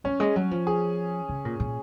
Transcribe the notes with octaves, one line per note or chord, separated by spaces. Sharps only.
F#3 C#4
G#3
F#3
F3
G#4
C#3
A#2
A#2